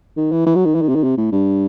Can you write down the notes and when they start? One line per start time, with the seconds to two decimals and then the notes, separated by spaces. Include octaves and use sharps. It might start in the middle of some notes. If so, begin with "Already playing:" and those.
0.17 D#3
0.32 E3
0.46 E3
0.56 F#3
0.65 D#3
0.75 E3
0.82 D#3
0.88 C3
0.96 D#3
1.04 C3
1.17 A2
1.32 G2